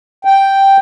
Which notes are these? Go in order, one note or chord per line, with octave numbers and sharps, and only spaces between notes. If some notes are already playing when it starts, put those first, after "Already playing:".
G5